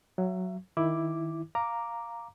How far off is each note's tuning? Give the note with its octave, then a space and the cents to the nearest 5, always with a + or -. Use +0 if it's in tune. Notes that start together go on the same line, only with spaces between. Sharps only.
F#3 +0 E5 +30
D#3 +10 E4 +0 D6 +0
F5 +0 A#5 +0 D6 +0